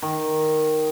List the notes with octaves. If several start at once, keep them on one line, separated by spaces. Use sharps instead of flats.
D#3